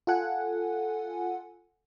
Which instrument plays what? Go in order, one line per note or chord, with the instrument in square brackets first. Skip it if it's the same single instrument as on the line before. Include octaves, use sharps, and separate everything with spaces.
[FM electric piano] F4 A4 F#5 G#5